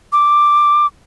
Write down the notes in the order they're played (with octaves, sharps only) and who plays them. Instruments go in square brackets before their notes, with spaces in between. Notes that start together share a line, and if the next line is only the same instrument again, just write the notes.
[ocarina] D6